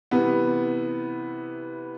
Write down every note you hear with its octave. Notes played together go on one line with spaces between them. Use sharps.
C3 E3 G3 B3